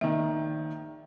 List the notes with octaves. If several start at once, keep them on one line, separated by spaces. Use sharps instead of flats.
A#1 D#3 E5